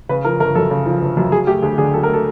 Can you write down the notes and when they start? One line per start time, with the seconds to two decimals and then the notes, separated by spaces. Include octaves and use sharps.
0.09 C#3 B4
0.25 F3 A#4
0.40 G1 A#4
0.55 F#2 A4
0.71 C#3
0.86 F3
1.02 G1
1.17 F#2
1.32 F#3 G#4
1.47 A3 G4
1.62 D2 G#4
1.78 D3 G#4
1.94 F#3 A4
2.03 A#4
2.08 A3
2.14 A4